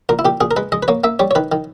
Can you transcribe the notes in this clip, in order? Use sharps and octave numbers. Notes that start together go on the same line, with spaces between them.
A#2 A#4
E4
A#2 G4
A#2 G#4
A#4
G#3 B4
G#3 D#5
B4
A#3 C#5
A#3 E5
G3 C#5
C#5
D#3 B4
D#3